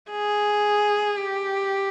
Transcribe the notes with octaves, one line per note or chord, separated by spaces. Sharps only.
G#4
G4